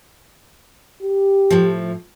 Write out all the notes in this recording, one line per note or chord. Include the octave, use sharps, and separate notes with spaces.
G4
A2 F3